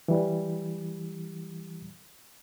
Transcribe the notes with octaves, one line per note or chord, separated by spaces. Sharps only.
E3 G3